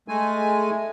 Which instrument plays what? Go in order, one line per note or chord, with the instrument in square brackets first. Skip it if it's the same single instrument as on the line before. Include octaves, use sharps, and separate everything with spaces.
[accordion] G#3 A3 G#5